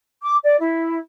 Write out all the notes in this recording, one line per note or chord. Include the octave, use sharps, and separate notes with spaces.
D6
D5
E4